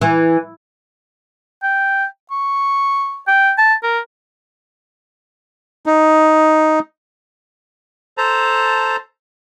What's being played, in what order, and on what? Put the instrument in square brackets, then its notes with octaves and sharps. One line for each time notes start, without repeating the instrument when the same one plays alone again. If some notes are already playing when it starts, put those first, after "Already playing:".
[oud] E3
[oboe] G5
C#6
G5
A5
A#4
[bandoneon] D#4
[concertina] A4 C5 A5 A#5